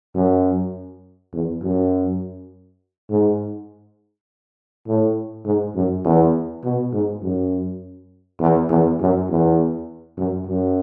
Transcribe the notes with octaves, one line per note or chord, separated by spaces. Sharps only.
F#2
E2
F#2
G#2
A2
G#2
F#2
E2
B2
G#2
F#2
E2
E2
F#2
E2
F#2
F#2